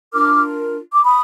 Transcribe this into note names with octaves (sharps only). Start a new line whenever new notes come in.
D4 F4 A#4 D6 F6
D6
B5 D#6